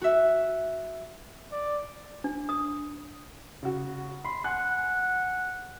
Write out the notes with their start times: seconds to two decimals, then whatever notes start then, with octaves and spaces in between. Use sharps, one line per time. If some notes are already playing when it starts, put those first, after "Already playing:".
0.02 F#4 E5
1.52 D5
2.24 D4
2.49 D#6
3.63 C#3 F#4
4.25 B5 C6
4.44 F#5 G#5 F#6